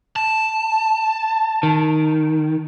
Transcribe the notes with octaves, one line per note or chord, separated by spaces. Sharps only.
A5
D#3